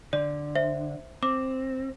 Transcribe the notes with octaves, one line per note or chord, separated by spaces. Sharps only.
D3 D5
C5 E5
C4 D6